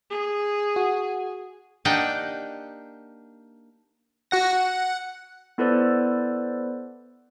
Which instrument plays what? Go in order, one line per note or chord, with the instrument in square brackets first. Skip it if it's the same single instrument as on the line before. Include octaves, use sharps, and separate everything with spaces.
[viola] G#4
[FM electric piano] F#4
[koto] A#3 D4 D#4 G4 F#5 G5
[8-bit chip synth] F#4 F#5 A#6
F#5
[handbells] B3 E4 A4 B4 C5 D5